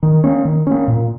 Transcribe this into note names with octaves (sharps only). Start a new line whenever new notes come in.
D#3
A#3 C#4
D#3
A#3 C#4
A#2